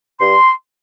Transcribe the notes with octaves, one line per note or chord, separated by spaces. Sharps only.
G2 C6